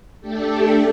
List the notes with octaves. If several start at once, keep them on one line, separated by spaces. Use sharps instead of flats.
A3 D4 G4 A4